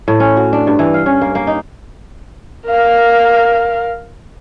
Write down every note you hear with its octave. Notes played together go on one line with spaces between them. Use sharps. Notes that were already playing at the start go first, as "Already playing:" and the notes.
A2
C#4
F#4
D4
G2
E3
F5
C#4
A#3
A#3
D#4
A#4 F5